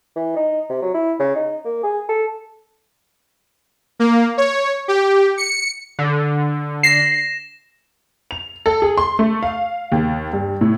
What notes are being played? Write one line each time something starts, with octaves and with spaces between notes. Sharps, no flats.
E3
D#4
C3
F#3
E4
C#3
D#4
A#3
G#4
A4
A#3
C#5
G4
C#7
D3
A#6 C7 E7
F7
A4
G#4
C6
A3
F5
D#2
G2
A2